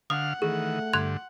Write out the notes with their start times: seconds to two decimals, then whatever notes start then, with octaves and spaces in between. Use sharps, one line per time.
0.10 D3 F5 F#5 D#6 F6
0.42 D#3 E3 A3 G#4
0.93 G2 D3 C6 F#6 G#6